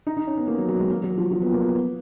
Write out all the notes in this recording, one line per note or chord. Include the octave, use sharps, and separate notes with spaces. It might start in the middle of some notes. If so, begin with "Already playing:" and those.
D#4
D#4
C#4
B3
A#3
F#3
F#3
G#3
A#3
F#3
F3
F3
B3
A#3
B3